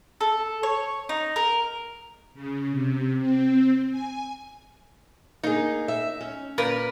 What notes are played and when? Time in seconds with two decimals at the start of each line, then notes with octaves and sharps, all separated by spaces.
0.21 A4
0.63 C#5
1.09 D#4
1.36 A#4
2.34 C#3
2.71 C3
3.19 C4
3.90 G#5
5.43 A#3 D#4 G#4
5.88 E5
6.21 C#4
6.58 A#2 A#4 B4